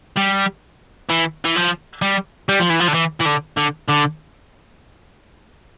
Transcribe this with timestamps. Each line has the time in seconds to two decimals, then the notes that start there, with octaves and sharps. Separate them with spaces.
0.16 G3
1.09 E3
1.45 E3
1.56 F3
2.02 G3
2.49 G3
2.59 F3
2.70 E3
2.80 F3
2.88 D3
2.95 E3
3.21 E3
3.26 D3
3.57 D3
3.88 D3